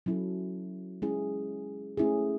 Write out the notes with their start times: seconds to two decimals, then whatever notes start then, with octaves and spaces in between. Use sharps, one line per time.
0.06 F#3 C#4 E4 A4
1.02 G#3 C#4 E4 G#4
1.97 A3 C#4 E4 G#4